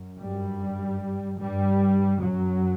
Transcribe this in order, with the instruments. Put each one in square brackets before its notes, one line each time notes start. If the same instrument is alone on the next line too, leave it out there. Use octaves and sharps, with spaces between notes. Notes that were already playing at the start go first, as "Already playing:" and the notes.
Already playing: [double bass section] F#2
G2 G3
G2 G3
F#2 F#3